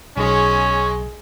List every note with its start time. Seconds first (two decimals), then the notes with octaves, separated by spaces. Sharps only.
0.17 B1 G#3 C#4 G#4 C#5